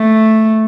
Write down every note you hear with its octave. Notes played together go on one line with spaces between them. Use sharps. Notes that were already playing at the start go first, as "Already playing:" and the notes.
Already playing: A3